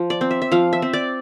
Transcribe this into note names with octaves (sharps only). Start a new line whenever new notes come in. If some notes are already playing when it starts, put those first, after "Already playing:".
Already playing: F3
D5
C4
E5
E5
F3 F5
E5
C4
D5